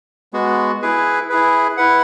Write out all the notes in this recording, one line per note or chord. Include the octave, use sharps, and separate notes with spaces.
G#3 B3 F#4
E4 G#4 B4
E4 G#4 B4
E4 B4 F#5